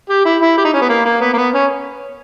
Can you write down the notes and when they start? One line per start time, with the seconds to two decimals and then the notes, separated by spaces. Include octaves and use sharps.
0.09 G4
0.25 E4
0.42 E4
0.58 G4
0.65 D#4
0.74 C#4
0.82 B3
0.89 A#3
1.06 A#3
1.21 B3
1.34 A#3
1.38 B3
1.54 C#4